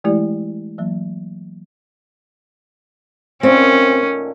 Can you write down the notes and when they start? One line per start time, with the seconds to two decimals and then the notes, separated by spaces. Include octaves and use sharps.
0.04 E3 G#3 A3 E4 G4 D5
0.78 E3 F#3 A#3
3.43 A#2 D#3 A3 C4 C#4